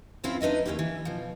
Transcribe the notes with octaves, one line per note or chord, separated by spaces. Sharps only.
G2 E3 C4 C#4 E4 F4
D4 D#4 B4 D#5 E5
D#2 C3 C#4 E4 G4
E3
B2 F3